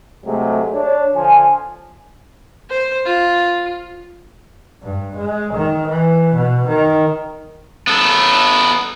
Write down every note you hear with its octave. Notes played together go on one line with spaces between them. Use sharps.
C3 F#3 G#3 A3
D4 C#5
D3 F3 G#5
C5
F4
G2
G#3
D#3
E3
B2
D#3
B3 A4